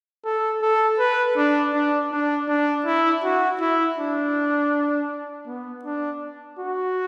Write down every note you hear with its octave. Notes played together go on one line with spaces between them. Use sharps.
A4
A4
B4
D4
D4
D4
D4
E4
F#4
E4
D4
B3
D4
F#4